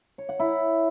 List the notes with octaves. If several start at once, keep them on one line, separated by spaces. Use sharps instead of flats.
C#5
F#5
E4